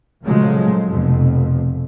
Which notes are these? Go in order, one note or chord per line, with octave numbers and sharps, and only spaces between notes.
A#2 C#3 F3 F#3 G#3 A3
F1 F2 B2